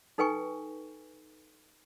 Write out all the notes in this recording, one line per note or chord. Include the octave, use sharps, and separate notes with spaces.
D#4 A4 B4 G5 G#5 C#6